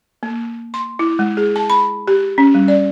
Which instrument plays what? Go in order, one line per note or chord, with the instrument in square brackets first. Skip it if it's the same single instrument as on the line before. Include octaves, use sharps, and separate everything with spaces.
[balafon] A#3
C6
E4
G#3
G#4
A5
B5
G4
C#4
G3
D5